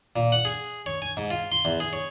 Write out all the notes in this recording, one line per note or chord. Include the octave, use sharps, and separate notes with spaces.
A#2
F#5
G#4
C#5
G#5
G#2
F4
C6
E2
G#4
C#5